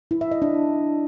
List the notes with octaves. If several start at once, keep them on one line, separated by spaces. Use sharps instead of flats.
E4
E5
D#5
D4